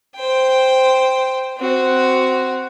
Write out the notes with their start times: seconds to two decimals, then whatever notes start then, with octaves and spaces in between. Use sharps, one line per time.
0.16 C5 G5
1.58 C4 F#4